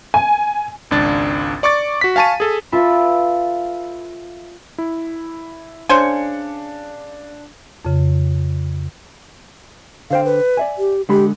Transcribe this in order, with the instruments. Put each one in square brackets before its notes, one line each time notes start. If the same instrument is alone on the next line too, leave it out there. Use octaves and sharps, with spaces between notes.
[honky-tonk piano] G#5
[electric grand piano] G#1 C#2 D4 A6
D5 C#6 D6 A6
F#4 B6
F5 G#5 A5 C#6 D#7
G#4 A4
[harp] F4 A4 B4 E5 F5 B5
[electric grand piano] E4
[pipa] C#3 C5 G#5 [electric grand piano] D4 C#7
[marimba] F2 C#3
[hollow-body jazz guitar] D3 C5 G5 [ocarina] F5
[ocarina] B4
[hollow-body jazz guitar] D5 E5 G#5
[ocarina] G4
[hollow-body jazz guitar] D3 G#3 B5 [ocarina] G4